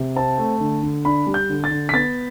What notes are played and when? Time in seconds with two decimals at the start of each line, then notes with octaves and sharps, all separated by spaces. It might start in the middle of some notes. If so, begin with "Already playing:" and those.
Already playing: C3
0.16 C4 A5
0.38 A3
0.60 D3
0.83 D3
1.05 D4 B5
1.27 G3
1.34 G6
1.49 D3
1.64 A6
1.71 D3
1.89 B6
1.93 B3 A6